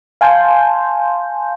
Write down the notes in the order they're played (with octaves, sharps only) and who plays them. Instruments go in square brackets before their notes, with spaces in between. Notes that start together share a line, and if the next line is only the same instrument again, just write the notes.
[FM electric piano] F5 G#5 A5 C6 G6